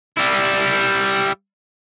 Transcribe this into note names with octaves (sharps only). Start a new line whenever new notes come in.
G3 E4